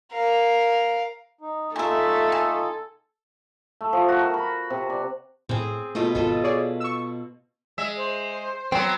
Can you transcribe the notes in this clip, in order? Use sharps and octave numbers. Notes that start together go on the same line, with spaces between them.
A#4 F5
D#4
A3 D#4 F4 A4 E5 G#5
G#5
A3
F3
F#4
A#4
B5
C3
D5
A2 C4 G#4
B2 A3 F4 D#5
G#1 F4 A4 D#5
G#4 C#5 D5
C#6 E6
G#3 E5
C5
F#3 B3 C4